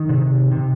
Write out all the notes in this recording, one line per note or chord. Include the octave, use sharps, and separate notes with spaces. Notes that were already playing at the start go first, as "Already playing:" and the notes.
Already playing: D#3
C3
C3